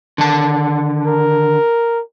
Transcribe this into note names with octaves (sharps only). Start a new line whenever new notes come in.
D3 D#3 A5
A#4